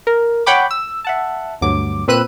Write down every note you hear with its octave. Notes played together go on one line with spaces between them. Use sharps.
A#4
C#5 F#5 G5 B5 D6
E6
E5 F#5 A5
D2 G2 F#3 D6
A#2 C4 B4 E6 F#6 D#7